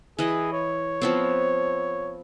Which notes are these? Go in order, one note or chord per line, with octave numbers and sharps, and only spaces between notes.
E3 G#4 B4 D#5
C#5
F3 B3 C4